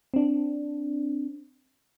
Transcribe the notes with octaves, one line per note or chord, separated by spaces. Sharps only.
C4 D4